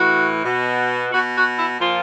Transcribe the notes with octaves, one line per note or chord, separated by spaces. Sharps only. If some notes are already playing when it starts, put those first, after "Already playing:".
Already playing: A2 E3 F#4
B2
B2 F#4
F#4
E4
A#2 F3 F4